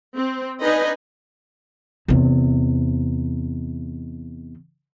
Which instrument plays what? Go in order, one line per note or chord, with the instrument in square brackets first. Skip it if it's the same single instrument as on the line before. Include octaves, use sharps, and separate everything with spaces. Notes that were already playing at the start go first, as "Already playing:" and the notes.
[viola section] C4
D4 D#4 B4 D#5 G#5
[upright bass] E2 C3